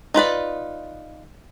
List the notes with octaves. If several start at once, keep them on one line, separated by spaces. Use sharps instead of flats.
D#4 F4 B4 D5